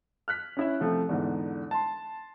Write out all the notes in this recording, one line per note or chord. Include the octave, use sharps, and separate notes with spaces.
F6 F#6 B6
C#4 E4 E5
C2 F3 A3 C4
E2 G#2 D3
A5 C6